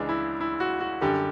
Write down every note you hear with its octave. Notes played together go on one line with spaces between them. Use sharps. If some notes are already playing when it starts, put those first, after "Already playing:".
Already playing: C#2 C#3 E3 G#3 D4
E4
E4
F#4
F#4
F#2 D3 G3 G4